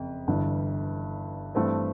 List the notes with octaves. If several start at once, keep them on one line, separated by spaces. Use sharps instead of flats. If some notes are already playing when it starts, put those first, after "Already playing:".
Already playing: F#1 F2
G1 G2 E3
G2 E3 A3 C4